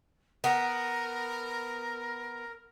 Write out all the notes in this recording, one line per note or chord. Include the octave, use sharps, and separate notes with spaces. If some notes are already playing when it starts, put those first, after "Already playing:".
B3 A#4